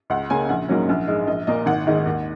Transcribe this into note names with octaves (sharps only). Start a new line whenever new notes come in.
C#2 F#5
C#3 A#3 C#4 G#5
A#1 F#5
G#2 F#3 A#3 C#4
A#1
G#2 G#3
A#1 D#5
A#2 A#3 D#5
G#1 F#5
G#2 D#3 G#3
D#2